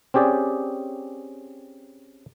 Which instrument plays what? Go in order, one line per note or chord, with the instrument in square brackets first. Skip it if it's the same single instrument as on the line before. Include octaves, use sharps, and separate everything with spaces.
[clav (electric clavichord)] C4 C#4 G4 G#4 D5